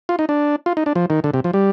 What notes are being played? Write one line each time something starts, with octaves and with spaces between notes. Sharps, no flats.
F4
D#4
D4
F4
D#4
D4
F3
D#3
D3
C3
F3
G3